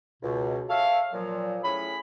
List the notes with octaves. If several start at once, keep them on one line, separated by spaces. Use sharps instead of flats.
C#2 B2
A4 C#5 E5 F5
A#2 F3 F#3
A2 C#4 G#4 B5